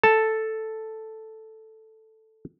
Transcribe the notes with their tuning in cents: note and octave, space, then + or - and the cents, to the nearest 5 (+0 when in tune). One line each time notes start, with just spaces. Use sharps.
A4 +0 A5 +0